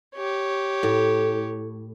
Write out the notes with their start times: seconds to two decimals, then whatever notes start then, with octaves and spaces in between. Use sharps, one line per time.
0.15 G4 C#5
0.83 A2